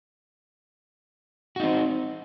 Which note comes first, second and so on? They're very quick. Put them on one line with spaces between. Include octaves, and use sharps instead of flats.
F#4 D#4 C4